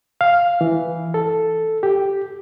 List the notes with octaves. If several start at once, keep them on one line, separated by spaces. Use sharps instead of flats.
F5
E3
A4
G4